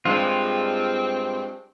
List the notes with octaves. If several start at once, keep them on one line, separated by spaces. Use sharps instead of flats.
G2 G#3 C4 F4